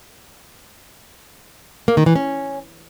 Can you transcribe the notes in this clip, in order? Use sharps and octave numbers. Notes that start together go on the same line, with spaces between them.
A#3
D#3
E3
C#4